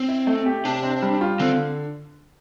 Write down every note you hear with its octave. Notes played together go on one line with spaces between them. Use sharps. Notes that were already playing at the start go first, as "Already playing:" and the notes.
Already playing: C4
E4
A3
G4
C3 D4
C4
G3
F4
D3 C4